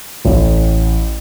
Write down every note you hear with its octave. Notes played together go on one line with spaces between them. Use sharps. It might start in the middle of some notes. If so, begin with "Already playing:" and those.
A1